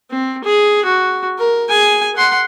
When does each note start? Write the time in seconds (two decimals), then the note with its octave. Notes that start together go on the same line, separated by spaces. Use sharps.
0.11 C4
0.44 G#4
0.85 F#4
1.39 A#4
1.70 G#4 G#5
2.16 F#5 C6